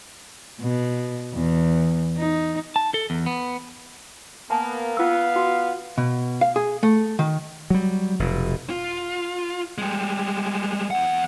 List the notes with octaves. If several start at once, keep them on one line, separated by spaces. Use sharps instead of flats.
B2
E2
D#4
A5
A4
E2
B3
A#3 B3 G#5 A5
B3 F4 F5 E6
F#4
B2
F5
G#4
A3
D#3
F#3 G3
F1 B2
F4
G3 G#3
E2 F#5